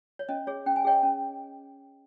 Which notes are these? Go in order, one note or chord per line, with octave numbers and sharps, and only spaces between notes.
C#5
C#4 D#5
G#4 C#5
C#4 G5
G#5
G#4 C#5 D#5 G5
C#4